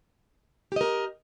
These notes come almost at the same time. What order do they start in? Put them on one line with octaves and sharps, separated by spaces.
G4 D#5 A#4